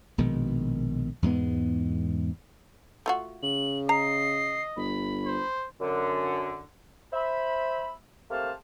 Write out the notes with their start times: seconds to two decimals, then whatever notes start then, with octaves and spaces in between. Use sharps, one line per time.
0.18 A#1 B2 D#3 G#3
1.22 E2 G#2 G#3 B3
3.06 A3 F4 F#4
3.43 C#3 F#7
3.89 D#5 A#5 C7
4.76 G1 B5
5.26 C5
5.81 F#2 D3
7.13 C5 E5 B5
8.30 C3 A3 A#3 C5 A5 F6